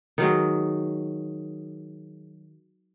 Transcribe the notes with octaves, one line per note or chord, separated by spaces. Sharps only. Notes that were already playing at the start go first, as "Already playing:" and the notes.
D#3 F#3 G#3